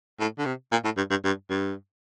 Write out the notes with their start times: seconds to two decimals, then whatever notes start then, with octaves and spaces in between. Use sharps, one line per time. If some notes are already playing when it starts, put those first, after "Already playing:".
0.20 A2
0.38 D3
0.45 C3
0.72 A#2
0.85 A2
0.97 G2
1.10 G2
1.24 G2
1.50 G2